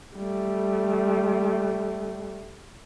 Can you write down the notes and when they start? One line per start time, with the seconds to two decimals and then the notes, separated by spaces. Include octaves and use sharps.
0.17 G3 A3